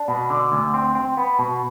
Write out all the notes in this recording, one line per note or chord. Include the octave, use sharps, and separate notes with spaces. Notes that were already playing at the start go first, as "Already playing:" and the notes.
Already playing: D4
B2
D3
D2
C4
C4
B3
B2